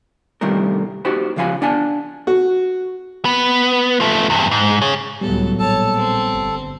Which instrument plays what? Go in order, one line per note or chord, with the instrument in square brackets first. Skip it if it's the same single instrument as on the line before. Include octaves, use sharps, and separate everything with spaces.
[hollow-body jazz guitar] G2 C3 D#3 G3 A3 A#4
D#4 F#4 G4 C5 B5
C#2 C#3 F3 F5 G#5 B5
D4 F#5 G#5 A5
[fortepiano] F#4
[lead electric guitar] B3
F3 A3
E2 G2
G#2
G#4 C#5
[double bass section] C#2 A2 F#3 [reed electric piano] G3 B3 [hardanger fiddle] A4
[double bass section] A#1 [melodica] A4 [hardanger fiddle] C#5 A5
[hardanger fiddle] C4
[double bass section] G1